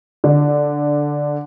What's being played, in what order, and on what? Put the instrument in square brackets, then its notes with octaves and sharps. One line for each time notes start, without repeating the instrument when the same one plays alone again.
[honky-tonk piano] D3